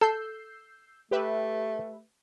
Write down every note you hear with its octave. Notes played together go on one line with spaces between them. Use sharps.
A4 E6 G6 C7
A3 G4 B4 E5